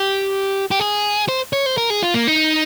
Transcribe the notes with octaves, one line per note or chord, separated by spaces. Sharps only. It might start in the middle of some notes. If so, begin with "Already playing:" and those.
Already playing: G4
G4
G#4
C5
C#5
C5
A#4
G#4
F4
A#3
D#4